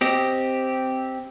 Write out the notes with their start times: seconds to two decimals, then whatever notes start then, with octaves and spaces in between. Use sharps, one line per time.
0.01 C4 G4 D#5